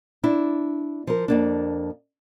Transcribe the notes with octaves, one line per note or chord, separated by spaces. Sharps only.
D4 E4
F3 A#4
F2 A#3 D4